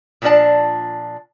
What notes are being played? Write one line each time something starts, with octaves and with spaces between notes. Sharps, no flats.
A#2 F3 B3 D4 D5 A5